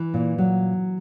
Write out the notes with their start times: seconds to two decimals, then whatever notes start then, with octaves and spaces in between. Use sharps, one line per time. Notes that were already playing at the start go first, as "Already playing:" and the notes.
Already playing: E3
0.14 A#2
0.38 F#3